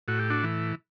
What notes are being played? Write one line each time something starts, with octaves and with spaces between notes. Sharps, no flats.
A2 F#4
G4
D4 F#4
E3